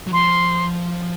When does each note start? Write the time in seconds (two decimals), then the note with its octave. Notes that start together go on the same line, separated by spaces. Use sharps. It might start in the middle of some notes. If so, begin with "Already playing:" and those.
0.07 F#3
0.13 F3 C6